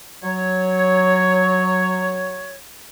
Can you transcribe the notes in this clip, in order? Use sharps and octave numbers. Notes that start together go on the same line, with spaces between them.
F#3 C#5